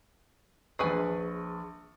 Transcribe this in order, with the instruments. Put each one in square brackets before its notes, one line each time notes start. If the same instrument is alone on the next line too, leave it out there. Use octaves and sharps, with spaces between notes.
[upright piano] A#1 C#6 [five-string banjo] G#4 B4 G#5